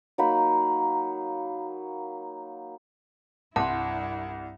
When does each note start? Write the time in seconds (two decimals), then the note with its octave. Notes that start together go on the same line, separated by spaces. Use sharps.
0.18 F#3 A#3 D#4 B5
3.56 C2 G2 E4 F#5 A5 C6